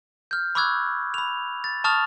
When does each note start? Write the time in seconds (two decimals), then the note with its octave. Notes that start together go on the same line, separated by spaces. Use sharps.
0.31 F6 G6
0.55 B5 C#6 D6 E6 F#6 G#6
1.14 B5 F7
1.64 A6
1.84 A5 C#6 D#6 F6 A6 F7